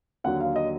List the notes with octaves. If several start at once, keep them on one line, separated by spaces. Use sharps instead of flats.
D#2 D3 F#3 F#5
F5
D#5